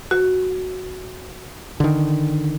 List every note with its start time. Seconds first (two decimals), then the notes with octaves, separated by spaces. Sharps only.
0.11 F#4
1.80 D3 D#3